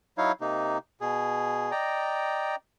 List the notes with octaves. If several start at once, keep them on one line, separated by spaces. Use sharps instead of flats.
F#3 D#4 E4 C#5 F5
C3 A#3 D#4
B2 G#4
D5 D#5 G5 A#5